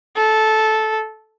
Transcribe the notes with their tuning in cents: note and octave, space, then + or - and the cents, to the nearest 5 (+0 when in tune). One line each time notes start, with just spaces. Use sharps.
A4 -10